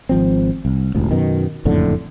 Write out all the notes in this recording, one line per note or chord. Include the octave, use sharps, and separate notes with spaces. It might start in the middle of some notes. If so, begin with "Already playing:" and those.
G#1 F3 C4
C2
E1 A1 D2
F#2 B2 D#3
F#1 F2 A2 D3